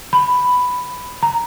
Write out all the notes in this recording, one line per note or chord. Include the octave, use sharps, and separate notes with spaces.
B5
A#5